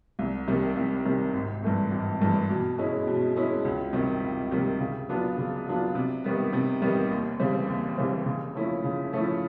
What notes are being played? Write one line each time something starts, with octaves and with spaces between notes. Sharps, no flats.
C2
C3 D#3 G3
C2
C3 D#3 G3
G#1
G2 E3 A3
G#1
G2 E3 A3
B2
G#3 C#4 E4
B2
G#3 C#4 E4
C#2
C3 D#3 G3
C#2
C3 D#3 G3
C#3
F#3 B3 D4 F4
C#3
F#3 B3 D4 F4
C3
D#3 G3 B3
C3
D#3 G3 B3
D#2
C#3 E3 G3 C4
D#2
C#3 E3 G3 C4
C#3
F3 A3 C#4 E4
C#3
F3 A3 C#4 E4